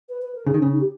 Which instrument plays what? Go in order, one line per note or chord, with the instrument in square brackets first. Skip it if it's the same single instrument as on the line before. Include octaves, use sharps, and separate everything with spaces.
[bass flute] B4
B4
A#4
[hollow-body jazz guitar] C#3 [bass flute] G#4
[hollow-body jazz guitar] D#3
[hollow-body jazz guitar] C#3 [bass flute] C#4
[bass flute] D#4
G4